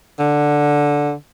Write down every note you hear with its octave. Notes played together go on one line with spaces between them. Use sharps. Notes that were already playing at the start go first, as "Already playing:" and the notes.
D3